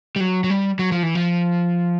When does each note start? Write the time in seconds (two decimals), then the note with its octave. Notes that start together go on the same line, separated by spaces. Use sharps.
0.16 G3
0.20 F#3
0.44 F#3
0.50 G3
0.79 F#3
0.92 F3
1.03 E3
1.15 F3